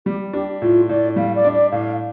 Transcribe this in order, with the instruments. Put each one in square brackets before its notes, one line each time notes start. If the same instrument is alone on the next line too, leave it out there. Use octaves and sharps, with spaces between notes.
[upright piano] G3 [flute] G4
[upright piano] D4 [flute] G4
[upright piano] A2 [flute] F4
[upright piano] A2 [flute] D5
[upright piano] G3 [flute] F5
[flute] D5
[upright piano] D4
[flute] D5
[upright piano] A2 [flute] F5